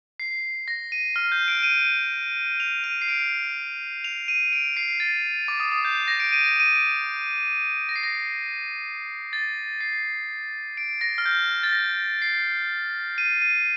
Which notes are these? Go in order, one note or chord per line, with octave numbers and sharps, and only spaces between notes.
C7
A#6
D#7
F6
G6
D7
D#7
F7
D#7
C7
D7
F7
D#7
D7
C7
A6
D6
D#6
D#6
G6
A#6
D7
D#7
A#6
D#7
D7
A#6
C7
A#6
A6
C7
D7
A#6
F6
G6
A6
A#6
C7
D#7
D#7